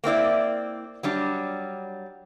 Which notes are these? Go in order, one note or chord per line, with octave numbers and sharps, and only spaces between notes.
A#3 C4 E4 D5
F#3 G3 D4